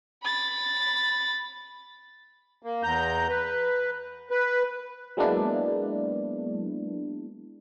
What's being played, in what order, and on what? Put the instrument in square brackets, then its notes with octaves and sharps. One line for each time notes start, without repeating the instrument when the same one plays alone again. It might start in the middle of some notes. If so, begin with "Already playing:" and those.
[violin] B5 A6
[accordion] A#3
E2 A#5 G6
B4
B4
[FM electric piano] F#3 G#3 A#3 B3 D4 E4